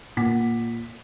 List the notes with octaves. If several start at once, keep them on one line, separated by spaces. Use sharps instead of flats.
A#2 F#5 D6 B6